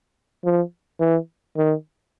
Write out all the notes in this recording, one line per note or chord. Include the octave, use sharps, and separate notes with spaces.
F3
E3
D#3